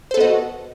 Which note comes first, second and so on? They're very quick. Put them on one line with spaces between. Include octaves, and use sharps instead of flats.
C5 A4 B3 D#5 F#4